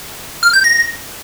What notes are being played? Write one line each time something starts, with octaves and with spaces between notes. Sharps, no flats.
F6
G6
A#6